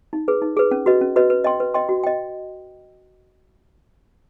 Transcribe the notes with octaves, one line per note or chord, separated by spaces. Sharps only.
D#4
G#4 B4
D#4
G#4 B4
C#4
F#4 B4 D#5
C#4
F#4 B4 D#5
B4
D#5 G5 C6
B4
D#5 G5 C6
F#4
D#5 G5